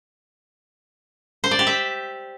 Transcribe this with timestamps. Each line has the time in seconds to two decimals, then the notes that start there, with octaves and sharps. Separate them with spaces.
1.44 C5
1.51 D5
1.59 G4
1.67 E5